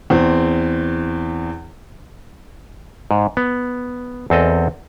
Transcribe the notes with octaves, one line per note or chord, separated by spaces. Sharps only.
E2 C4
G#2
B3
E2 C4 A4 D#5